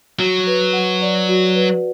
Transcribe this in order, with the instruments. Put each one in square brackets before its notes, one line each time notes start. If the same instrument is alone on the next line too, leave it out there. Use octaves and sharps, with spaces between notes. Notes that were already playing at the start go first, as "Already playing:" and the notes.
[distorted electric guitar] F#3 [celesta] F#4
[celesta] B4
F#5
D5
F#4
B4